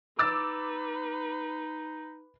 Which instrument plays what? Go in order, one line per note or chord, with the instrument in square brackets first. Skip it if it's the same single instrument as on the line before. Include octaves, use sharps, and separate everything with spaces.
[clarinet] D#4 [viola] B4 [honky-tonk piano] D6 E6 A6